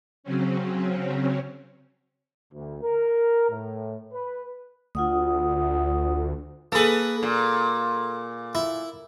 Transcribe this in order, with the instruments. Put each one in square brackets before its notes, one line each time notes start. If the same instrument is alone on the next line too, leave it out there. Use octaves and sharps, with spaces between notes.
[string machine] C#3 F#3 C4 C#4
[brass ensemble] D2
A#4
A2
B4
[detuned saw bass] D2 [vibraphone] F4 F#5 D#6
[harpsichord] A#3 G#4 [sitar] A4 B4
[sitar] A#2
[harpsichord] E4